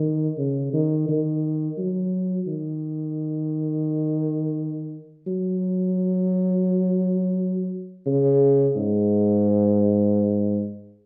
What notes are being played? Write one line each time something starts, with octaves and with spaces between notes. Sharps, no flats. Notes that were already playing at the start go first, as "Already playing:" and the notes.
Already playing: D#3
C#3
D#3
D#3
F#3
D#3
F#3
C#3
G#2